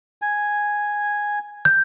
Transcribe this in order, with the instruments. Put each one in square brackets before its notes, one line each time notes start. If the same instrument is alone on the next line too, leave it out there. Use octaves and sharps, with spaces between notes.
[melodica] G#5
[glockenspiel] G6